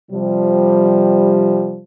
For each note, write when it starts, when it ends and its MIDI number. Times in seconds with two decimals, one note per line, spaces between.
0.11 1.81 48
0.11 1.81 53
0.11 1.81 55